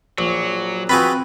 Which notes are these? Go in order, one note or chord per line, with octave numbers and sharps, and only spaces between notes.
A#1 F#3
C4 F4 F#4 G#4 B4